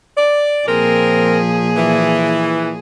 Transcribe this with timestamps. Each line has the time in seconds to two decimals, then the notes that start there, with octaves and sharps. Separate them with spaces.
0.17 D5
0.67 A#2 F3 C4 G#4 A#4
1.76 E3